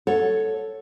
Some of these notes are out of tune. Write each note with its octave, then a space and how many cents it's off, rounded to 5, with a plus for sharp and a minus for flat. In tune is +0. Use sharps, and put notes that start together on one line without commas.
A4 +0 C#5 +0 F#5 -20